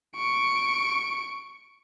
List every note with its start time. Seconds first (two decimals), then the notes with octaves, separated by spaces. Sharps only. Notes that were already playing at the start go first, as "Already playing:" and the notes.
0.16 C#6 D7